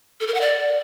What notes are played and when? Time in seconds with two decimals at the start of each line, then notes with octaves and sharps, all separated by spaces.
0.20 A4
0.27 A#4
0.34 F#5
0.41 D5